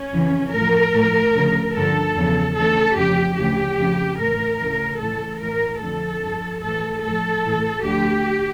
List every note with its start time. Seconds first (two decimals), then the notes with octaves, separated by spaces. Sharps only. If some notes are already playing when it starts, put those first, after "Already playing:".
Already playing: C#4
0.13 F2 C#3 E3
0.54 A2 F3 A#4
0.95 A2 F3
1.36 D2 C#3 F3
1.76 G2 D3 F3 A4
2.17 E2 C#3 F3
2.57 D2 C#3 E3 A4
2.97 F2 C#3 F3 G4
3.38 D2 C#3 E3 G4
3.79 F2 C#3 F3
4.19 A2 E3 A#4
4.60 D2 C#3 E3
5.00 A2 E3 A4
5.41 A2 E3 A#4
5.82 F2 D3 F3 A4
6.23 G2 F3
6.63 A2 E3 A4
7.04 A2 F3 A4
7.45 A2 E3
7.85 D2 D3 F3 G4